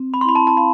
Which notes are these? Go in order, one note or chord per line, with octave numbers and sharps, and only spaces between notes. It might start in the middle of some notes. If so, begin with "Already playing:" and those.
Already playing: C4
B5
C6
E4 B5
A5
A5
F5 B5